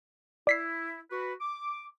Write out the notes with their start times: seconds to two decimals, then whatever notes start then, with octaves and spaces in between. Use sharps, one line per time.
0.47 E4 D5 B6 C7
1.11 F#4 B4
1.39 D6